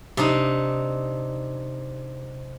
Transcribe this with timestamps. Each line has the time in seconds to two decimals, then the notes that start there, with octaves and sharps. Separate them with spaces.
0.17 C3 D4 D#4